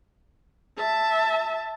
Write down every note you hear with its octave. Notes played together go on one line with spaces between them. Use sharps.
E5 A5